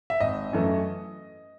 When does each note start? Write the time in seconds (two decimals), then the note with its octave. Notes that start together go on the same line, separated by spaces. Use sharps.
0.10 E5
0.20 G#1 D#5
0.53 F#2 E3 A3